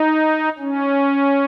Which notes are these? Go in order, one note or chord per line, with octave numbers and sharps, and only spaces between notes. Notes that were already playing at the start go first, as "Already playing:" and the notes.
Already playing: D#4
C#4